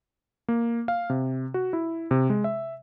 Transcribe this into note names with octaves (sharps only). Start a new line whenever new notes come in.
A#3
F5
C3
F#4
E4
C3
G#3
E5